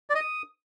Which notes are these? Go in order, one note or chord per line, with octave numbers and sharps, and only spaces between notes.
D5
D#5
D#6